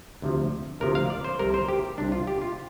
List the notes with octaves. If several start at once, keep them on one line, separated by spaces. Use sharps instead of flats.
D2 C3 F3
D2 C3 F3 A#4
F5
D5
C5
C2 C3 G3 A#4
C5
G4
C2 C3 G3 D4
F4
G4
F4